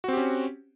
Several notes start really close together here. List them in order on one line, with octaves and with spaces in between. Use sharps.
F#4 C4 G4 C#4